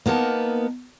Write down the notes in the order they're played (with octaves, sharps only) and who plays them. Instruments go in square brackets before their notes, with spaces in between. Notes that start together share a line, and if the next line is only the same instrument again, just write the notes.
[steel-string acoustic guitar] A#3 B3 D#4 A#4 A5